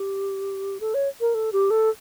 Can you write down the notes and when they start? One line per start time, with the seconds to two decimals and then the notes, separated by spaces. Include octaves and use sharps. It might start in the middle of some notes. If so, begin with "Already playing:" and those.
Already playing: G4
0.80 A4
0.94 C#5
1.21 A#4
1.34 A4
1.53 G4
1.70 A4